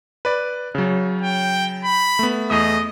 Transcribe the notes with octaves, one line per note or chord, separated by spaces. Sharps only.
B4 D5
C#3 F#3
G5
B5
A3 B3
E2 A3 D#5 D#6